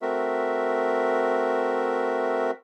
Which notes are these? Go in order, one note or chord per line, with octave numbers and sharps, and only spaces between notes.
A3 C4 F#4 A#4 E5